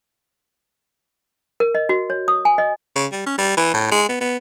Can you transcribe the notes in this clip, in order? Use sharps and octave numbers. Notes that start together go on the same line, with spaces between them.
A#4
D#5
F#4
C#5
D#6
G#5
D#5
C#3
G3
C#4
G3
E3
A2
G#3
B3
B3